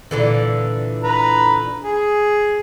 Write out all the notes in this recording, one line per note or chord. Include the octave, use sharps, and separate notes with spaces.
A#2 D3 E3
B4 A#5
G#4